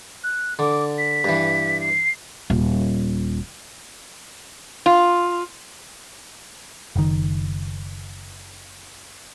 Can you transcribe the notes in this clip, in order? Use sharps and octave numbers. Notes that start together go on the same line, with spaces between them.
F#6
D3 D6
B6
G2 E3
C7
D#1
F4
F#1 D#3